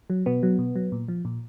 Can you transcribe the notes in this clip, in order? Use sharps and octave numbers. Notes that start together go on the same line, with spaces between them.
F#3
B2 B3
F#3
B2
F#3
A#2
F3
A#2